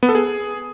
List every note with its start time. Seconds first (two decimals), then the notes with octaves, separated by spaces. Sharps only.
0.03 B3
0.09 A4
0.15 G#4